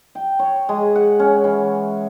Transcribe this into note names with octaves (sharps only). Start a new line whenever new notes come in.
G5
C#5
G#3
F#5
C#4
E3